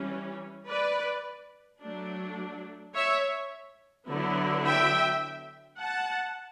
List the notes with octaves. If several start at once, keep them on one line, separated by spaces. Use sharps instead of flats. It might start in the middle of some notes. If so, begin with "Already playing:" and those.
Already playing: E3 G3 C#4
B4 D5
F#3 A3 D4
C#5 E5
D3 F#3 B3 E4
E5 G5
F#5 A5